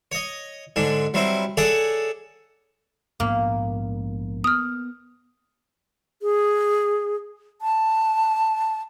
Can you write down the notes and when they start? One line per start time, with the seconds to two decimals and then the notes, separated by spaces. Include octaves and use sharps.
0.12 C#5 D#5
0.76 G#2 D3 G#3 D4
1.14 F#3 G3 C4 E4 C5
1.57 G#4 A4 C#5 D5 E5 F#5
3.20 A#1 G#2 A#3 B3
4.44 B3 D#6 F6
6.22 G#4
7.62 A5